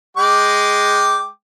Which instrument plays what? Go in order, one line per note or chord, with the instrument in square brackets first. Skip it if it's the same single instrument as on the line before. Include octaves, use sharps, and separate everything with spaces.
[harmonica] G#3 G5 D6